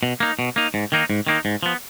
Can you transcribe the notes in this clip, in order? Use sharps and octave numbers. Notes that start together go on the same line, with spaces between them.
B2
A#3 D#4
B2
A#3 D#4
G#2
D#3 A#3 D#4
G#2
D#3 A#3 D#4
G#2
F3 B3